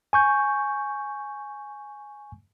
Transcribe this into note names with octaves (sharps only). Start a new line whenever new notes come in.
G#5 C#6 G6